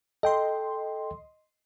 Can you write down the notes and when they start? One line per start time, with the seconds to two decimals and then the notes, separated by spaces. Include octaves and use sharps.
0.23 A4 D#5 G5 C6